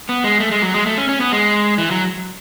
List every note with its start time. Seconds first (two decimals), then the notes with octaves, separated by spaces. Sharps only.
0.09 B3
0.24 G#3
0.40 A3
0.51 G#3
0.62 F#3
0.74 G#3
0.86 A3
0.97 C#4
1.09 C#4
1.20 B3
1.32 G#3
1.78 E3
1.91 F#3